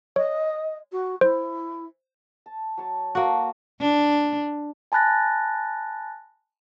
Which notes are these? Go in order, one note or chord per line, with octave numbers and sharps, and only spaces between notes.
C#5 D#5
F#4
E4 C5
A5
F#3 C#5 A5
A#3 F#4 A4 F5 A5
D4
G#5 A5 B5 F#6 A6 A#6